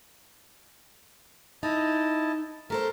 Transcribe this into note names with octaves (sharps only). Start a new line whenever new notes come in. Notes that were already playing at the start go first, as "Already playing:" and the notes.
D#4 E4 D#5 A5
A3 A4 A#4 C5